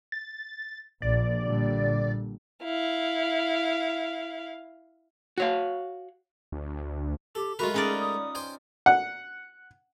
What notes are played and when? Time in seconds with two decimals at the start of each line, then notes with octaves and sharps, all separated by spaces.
0.12 A6
1.02 A#1 D5
1.42 A#2 D3 G3
2.63 E4 F5
5.38 F#4 C#5 F5
6.52 D2
7.35 G4 A4
7.59 G#3 A3 F4 F#4 A#4 B4
7.74 C#4 D#4 G#4 D5
8.00 D#6
8.35 C5 G5 G#5
8.86 F#5